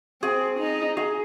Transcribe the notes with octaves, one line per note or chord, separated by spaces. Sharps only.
C4 G#4
D#4
G#4